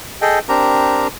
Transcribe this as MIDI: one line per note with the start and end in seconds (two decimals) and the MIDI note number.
0.22 0.39 68
0.22 0.39 69
0.22 0.39 75
0.22 0.39 79
0.49 1.07 60
0.49 1.07 62
0.49 1.07 67
0.49 1.07 70
0.49 1.07 82